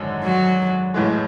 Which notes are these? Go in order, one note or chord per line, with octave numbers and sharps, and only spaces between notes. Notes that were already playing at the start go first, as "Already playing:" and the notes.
Already playing: G#1 F#2 D3 G#3
F#3
A1 A2 E3 G#3